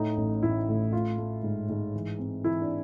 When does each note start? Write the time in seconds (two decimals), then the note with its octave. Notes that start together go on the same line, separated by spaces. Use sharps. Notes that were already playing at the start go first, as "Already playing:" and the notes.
Already playing: A2 D#4
0.17 A1
0.43 A1 E4
0.69 A2
0.93 A3 F4
1.18 A3
1.43 G#2
1.69 G#2
1.94 E3
2.19 C4
2.44 E3 E4
2.62 D4